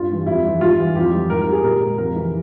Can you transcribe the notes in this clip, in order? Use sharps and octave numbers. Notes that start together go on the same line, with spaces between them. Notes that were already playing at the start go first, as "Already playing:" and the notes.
Already playing: G2 F4
E3 G3
F2 E4
E3 G3
G#2 F4
E3 G3
F2 G4
E3 G3
G#2 A#4
A#4
G3
G#4
A#2 A#4
G#3
F2 A#4
C3 E3